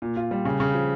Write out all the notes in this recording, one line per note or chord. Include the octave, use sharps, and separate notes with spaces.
A#2
F4
G3
C#3
C#3
F3